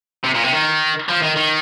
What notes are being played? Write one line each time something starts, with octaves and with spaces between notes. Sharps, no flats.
C3
A#2
C3
D#3
F3
D#3
D#3